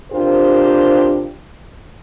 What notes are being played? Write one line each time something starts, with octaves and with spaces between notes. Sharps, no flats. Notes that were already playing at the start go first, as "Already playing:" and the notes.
C3 D4 F4 G4 A#4 C5